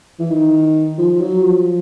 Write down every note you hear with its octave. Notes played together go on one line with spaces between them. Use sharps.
E3
D#3
F3
F#3
F3